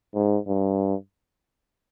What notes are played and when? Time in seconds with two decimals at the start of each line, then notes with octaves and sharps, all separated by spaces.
0.15 G#2
0.48 G2